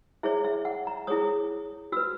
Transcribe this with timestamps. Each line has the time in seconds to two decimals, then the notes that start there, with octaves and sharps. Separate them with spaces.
0.23 E4 G#4 C#5 E5
0.44 E5
0.65 F#5
0.87 A#5
1.07 E4 G#4 C#5 D#6
1.92 F#4 B4 E6